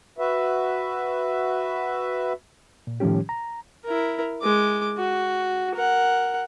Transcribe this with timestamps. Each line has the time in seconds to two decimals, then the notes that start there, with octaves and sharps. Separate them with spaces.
0.18 F#4 B4 E5
2.87 A#2
3.00 A2 D#3 F3 G3 C#4 G4
3.29 A#5
3.85 E4 A#4
4.42 G#3 D6
4.97 F#4
5.75 A#4 F#5